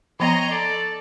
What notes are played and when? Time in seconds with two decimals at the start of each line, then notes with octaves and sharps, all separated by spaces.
0.20 F3 B3 C#5 D#5 G5 A#5 C6
0.51 A4 D5